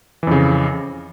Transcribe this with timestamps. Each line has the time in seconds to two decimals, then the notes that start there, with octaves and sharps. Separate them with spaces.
0.23 E3
0.27 F2
0.31 C#3